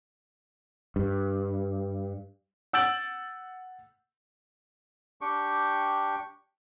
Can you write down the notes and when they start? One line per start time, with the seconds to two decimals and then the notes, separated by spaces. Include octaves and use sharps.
0.96 G2
2.73 F#5 E6 G6 A6 D7 F#7
5.21 D4 G4 G5 C#6